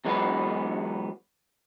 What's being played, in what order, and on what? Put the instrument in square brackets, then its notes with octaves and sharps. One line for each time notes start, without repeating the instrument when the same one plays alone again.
[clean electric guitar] E2 F#3 G#3 B3 F#4 B4